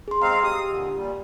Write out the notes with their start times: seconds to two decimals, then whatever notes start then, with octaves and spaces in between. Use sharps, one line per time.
0.08 G#4 C6
0.22 G#3 C4 F5 A#5
0.44 G4 D#6
0.69 A#2 D3
0.96 A#2 G3